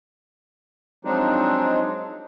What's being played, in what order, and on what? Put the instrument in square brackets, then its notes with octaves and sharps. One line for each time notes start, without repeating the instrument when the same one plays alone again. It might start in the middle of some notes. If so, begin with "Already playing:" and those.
[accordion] F3 F#3 G#3 C4 D4 D#4